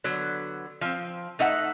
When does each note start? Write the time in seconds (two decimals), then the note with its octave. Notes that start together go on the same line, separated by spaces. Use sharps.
0.04 D3 F#3 B3
0.81 F3 C4
1.39 A3 D#4 E5 F#5